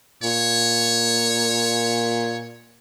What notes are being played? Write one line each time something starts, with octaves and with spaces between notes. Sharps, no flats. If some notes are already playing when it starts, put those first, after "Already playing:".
A#2 C#5